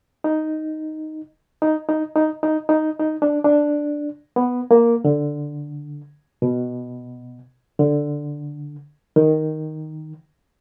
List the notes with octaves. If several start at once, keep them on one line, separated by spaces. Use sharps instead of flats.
D#4
D#4
D#4
D#4
D#4
D#4
D#4
D4
D4
B3
A#3
D3
B2
D3
D#3